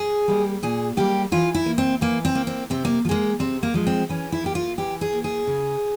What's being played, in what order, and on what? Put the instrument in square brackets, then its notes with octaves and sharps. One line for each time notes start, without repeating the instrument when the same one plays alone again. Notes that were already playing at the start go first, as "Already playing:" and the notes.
Already playing: [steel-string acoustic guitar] G#4
G3 A#3
A#2 G#4
G3 A#3 G4
E3 F4
E4
A#3
C4
E3 A#3
C4
A#3
C4
C3 C4
A#3
F3
G#3 A#3
C3 C4
A#3
F3 G#3
C4
E3 C#4
E4
A#3 G4
F4
E3 G4
G#4
A#3
G#4
C#3